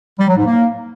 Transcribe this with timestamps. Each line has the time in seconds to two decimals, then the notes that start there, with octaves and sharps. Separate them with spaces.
0.19 G3
0.28 F#3
0.37 G#2
0.46 A#3